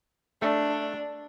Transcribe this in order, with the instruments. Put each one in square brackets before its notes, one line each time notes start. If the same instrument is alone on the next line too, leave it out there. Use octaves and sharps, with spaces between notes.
[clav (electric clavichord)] A3 [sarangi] D4